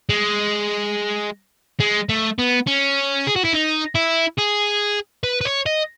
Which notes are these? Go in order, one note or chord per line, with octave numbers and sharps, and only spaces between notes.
G#3
G#3
A3
B3
C#4
G#4
F#4
E4
D#4
E4
G#4
B4
B4
C#5
D#5